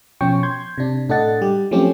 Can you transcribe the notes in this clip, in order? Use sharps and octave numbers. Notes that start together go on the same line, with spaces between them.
B2 F3 C#4 G5 C#6
C6 G6 G#6
C3 D4
A2 D4 A4 D#5 F#5 A6
G3 G4
F3 F#3 A3 C4 C#4 G4